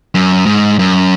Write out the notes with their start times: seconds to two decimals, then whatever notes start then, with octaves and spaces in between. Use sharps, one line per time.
0.15 F#2
0.46 G#2
0.79 F#2